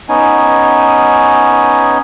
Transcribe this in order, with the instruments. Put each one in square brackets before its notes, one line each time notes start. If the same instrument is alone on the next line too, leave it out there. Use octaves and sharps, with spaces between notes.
[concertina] B3 C#4 D#4 G#5